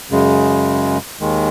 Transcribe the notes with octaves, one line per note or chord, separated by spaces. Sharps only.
F#2 C#3 G#3
D#2 D#3 G#3